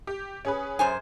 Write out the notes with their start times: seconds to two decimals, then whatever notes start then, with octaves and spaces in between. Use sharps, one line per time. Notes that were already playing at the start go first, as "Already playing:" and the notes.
0.07 G4
0.45 C#4 G#4 B4
0.79 F#2 C5 G#5